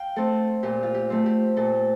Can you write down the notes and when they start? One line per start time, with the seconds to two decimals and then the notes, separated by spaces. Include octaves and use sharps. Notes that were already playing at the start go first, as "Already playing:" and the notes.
Already playing: F5 G5
0.16 A3 C4 A4
0.63 A#2 G4
0.83 F4
0.94 G4
1.10 A3 C4
1.26 G4
1.57 A#2 A4